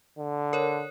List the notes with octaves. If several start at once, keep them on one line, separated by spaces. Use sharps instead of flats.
D3
A#4 C#5